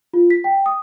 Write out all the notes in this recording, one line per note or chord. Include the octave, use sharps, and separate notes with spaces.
F4
B6
G5
D#6